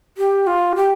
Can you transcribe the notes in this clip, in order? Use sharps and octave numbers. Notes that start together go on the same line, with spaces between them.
G4
F4
G4